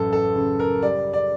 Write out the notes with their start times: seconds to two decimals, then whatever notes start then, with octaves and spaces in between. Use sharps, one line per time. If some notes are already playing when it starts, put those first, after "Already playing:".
Already playing: A1 F#2 A4
0.13 A4
0.36 C#3
0.59 A#4
0.82 G3 D5
1.13 D5